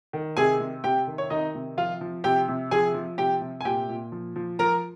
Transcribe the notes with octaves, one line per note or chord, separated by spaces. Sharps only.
D#3
C3 G#4 G#5
C3
C3 G4 G5
D#3
C#5
D#3 D#4 D#5
C3
F3 F4 F5
F3
C3 G4 G5
C3
F3 G#4 G#5
F3
C3 G4 G5
C3
G#5
A#2 G4 G5
A#2
F3
F3
F3 A#4 A#5